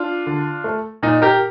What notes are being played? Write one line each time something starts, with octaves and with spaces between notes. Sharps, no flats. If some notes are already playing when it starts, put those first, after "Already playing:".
Already playing: D4 F4
D3
A3
A#2 D#4
G4 A#4